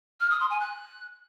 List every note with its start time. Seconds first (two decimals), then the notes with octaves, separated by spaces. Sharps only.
0.20 F6
0.30 D#6
0.40 C6
0.50 G#5
0.60 F#6